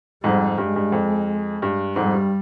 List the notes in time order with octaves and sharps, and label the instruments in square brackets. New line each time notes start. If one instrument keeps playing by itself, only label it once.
[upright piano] F2 G#2 [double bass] G3
[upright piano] G2 [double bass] G#3
[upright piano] G2
F2
G2
[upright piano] F2 G#2 [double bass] G3
[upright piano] G2